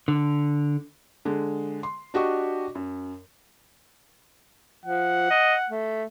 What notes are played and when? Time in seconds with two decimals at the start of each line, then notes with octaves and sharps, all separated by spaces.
0.08 D3
1.25 D3 G#3
1.83 C6
2.14 D4 F#4 G4 D#5 C#6
2.75 F#2
4.85 F3 F#5
5.30 D#5
5.69 A3